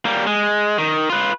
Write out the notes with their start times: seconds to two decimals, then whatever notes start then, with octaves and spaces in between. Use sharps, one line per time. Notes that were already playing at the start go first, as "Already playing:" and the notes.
0.06 G3 A#3
0.27 G#3
0.78 D#3
1.10 F4 B4